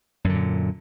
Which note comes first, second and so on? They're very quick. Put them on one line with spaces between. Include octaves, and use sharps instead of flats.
F#2 D3 A#2